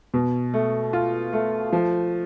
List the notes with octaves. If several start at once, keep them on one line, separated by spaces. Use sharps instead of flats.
B2
A3
F4
A3
F3